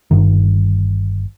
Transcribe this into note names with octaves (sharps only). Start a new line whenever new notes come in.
G1 G2 D#3